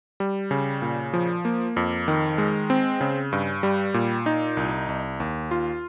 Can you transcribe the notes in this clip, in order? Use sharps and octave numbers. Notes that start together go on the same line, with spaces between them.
G3
C#3
A#2
F3
A#3
F2
D#3
G#3
C4
C#3
G2
G3
A#2
D#4
C2
C2
D#2
F4